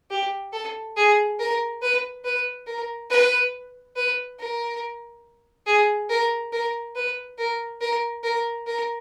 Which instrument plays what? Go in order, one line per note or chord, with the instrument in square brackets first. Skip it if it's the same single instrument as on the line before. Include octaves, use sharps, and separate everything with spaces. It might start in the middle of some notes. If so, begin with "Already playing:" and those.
[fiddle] G4
A4
G#4
A#4
B4
B4
A#4
B4
B4
A#4
G#4
A#4
A#4
B4
A#4
A#4
A#4
A#4